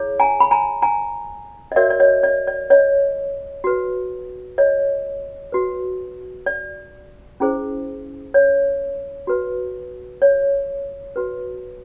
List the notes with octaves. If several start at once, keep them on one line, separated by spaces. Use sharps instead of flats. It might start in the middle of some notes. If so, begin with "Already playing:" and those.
Already playing: E4 G#4 C#5
G#5 A#5
B5
G#5 A#5
G#5 A#5
D#5
F#4 A#4 C#5 D5 E5
D5
C#5 D#5
D5
D5
C#5 D#5
F#4 B4
C#5 D#5
F#4 B4
D5
C#4 E4 G#4 C5
C#5
F#4 B4
C#5
F#4 B4